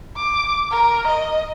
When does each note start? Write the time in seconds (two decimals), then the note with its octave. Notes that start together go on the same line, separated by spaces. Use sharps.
0.17 D6
0.71 A#4
1.07 D#5